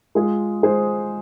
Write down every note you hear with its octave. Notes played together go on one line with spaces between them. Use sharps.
G#3 F4 G#4
G#3 G#4 C5